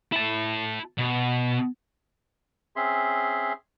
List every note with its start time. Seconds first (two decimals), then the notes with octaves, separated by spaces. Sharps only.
0.12 E4 A5
0.98 B2
2.76 C4 C#4 G#4 E5 C6